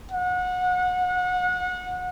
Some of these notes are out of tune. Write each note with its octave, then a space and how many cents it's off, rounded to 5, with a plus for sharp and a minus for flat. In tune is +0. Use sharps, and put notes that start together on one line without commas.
F#5 -30